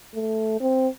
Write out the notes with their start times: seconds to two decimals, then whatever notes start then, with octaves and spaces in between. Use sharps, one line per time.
0.14 A3
0.60 C4